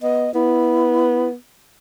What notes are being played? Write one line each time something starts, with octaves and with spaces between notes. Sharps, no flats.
B3 D#5
B3 E4